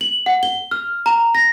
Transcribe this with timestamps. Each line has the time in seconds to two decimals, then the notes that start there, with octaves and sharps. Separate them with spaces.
0.01 F#7
0.26 F#5
0.43 G7
0.71 F6
1.06 A#5
1.35 A#6